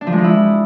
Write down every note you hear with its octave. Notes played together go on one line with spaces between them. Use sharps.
D4
F3
G#3
F3
E4